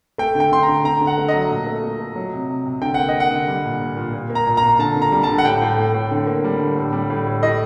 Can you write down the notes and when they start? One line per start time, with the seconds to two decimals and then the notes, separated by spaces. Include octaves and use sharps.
0.18 A3 G5
0.35 D3
0.40 G5
0.51 D3 C6
0.63 A#5
0.68 D3
0.84 D3 A#5
1.01 D3
1.07 F#5
1.18 A3
1.28 D#5
1.34 F#3
1.50 A#2
1.67 A3
1.84 A3
2.00 A3
2.16 F#3
2.33 C3
2.49 C3
2.65 C3
2.82 D3 G5
2.94 A#3 F#5
3.08 D#5
3.14 A#3
3.20 F#5
3.31 D3
3.48 G3
3.65 A#2
3.81 A#2
3.97 A#2
4.13 A#2
4.30 A#3
4.35 A#5
4.46 A#2
4.57 A#5
4.63 A#2
4.79 D3 A5
4.96 D3
5.02 A#5
5.12 G3
5.23 A5
5.29 D3
5.38 F#5
5.45 A2 G5
5.62 A2
5.78 A2
5.94 A2
6.11 D3
6.27 A#3
6.44 G3
6.60 D3
6.77 A2
6.93 G3
7.10 A2
7.27 A2
7.43 A2 D#5